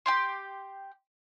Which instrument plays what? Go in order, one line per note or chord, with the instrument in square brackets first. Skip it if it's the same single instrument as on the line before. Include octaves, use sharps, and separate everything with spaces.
[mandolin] G4 G5 C6